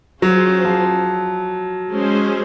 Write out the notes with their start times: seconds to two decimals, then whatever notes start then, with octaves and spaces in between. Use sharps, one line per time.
0.21 F#3 C#4 F4 G#4 C5
0.65 F3
1.90 G#3 C#4 G#4 C5